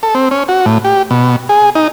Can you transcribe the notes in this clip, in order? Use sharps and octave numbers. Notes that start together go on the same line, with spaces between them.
A4
C4
C#4
F#4
A2
G4
B2
G#4
D#4